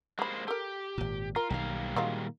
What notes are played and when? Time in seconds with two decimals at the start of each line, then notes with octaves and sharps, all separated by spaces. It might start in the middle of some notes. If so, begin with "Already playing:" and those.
0.19 G3 G#3 A#3 C5 B5
0.48 G4 A4 A#4
0.98 G#1 A#2
1.36 F4 A#4
1.50 B1 D#3 G3 A#3 F5
1.96 A#2 D#3 F#3 G#3 F4